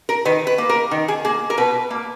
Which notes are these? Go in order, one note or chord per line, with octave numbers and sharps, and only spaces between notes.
A#4
D#3 B4
B4
A#3
A#4
D#3
G#4
A#3 G#4
A#4
B2 B4
A#3